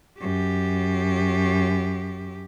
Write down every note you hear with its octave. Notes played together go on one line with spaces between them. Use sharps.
F#2 G4